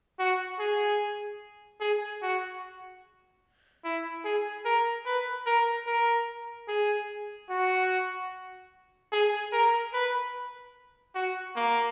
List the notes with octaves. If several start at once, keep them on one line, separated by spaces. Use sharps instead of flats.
F#4
G#4
G#4
F#4
E4
G#4
A#4
B4
A#4
A#4
G#4
F#4
G#4
A#4
B4
F#4
A#3